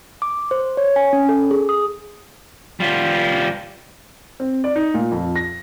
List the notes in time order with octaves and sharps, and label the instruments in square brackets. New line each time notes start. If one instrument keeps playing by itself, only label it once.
[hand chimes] D6
C5
C#5
G#5
C#4
A4
G#4
D#6
[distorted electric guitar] G3 F4
[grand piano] C4
D5
D#4
A#2
F2
A#6